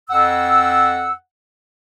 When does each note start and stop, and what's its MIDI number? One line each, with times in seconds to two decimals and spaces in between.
0.09 1.13 41
0.09 1.13 78
0.09 1.13 88